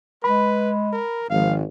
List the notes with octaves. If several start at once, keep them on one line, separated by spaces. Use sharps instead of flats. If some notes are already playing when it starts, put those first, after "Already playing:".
G#3 B4 B5
A#4
G#1 F3 F5